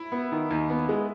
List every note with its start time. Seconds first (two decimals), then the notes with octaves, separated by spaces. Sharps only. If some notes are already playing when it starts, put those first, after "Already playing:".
Already playing: E4
0.12 B3
0.32 D#3
0.51 D#2
0.70 B3
0.89 G#3